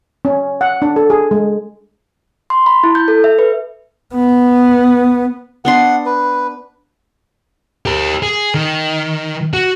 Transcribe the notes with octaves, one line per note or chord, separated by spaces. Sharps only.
C#4
F#5
D4
A4
G#4
G#3
C6
B5
E4
G6
A4
E5
B4
B3
B3 D4 F#5 C6
B4
G4 A#4
G#4
D#3
F#4